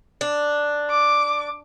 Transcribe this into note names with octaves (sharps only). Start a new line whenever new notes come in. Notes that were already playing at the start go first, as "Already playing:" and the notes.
D4
D6